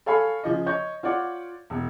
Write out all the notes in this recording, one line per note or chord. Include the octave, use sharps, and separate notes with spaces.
A4 C#5 F5 G#5 B5
C#3 F3 D#5
C#5 D#5 C#6 G6
F4 C#5 D5 F#5
E1